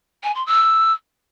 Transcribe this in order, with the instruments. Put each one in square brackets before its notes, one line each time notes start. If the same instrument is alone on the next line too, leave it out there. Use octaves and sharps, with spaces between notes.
[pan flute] G#5
C6
E6